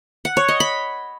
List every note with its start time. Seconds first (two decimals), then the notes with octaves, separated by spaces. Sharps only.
0.25 F#5
0.37 C#5
0.48 D#5
0.60 B5